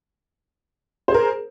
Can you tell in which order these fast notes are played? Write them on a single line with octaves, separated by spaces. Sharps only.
C5 G#4 A#4